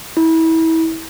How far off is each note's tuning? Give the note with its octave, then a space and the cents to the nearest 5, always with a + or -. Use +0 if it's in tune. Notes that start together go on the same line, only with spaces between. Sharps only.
E4 -25